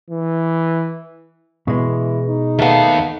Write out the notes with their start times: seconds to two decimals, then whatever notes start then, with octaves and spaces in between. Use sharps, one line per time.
0.10 E3
1.68 B2 E3 G#3
2.29 D#4
2.59 D#2 A3 B3 F5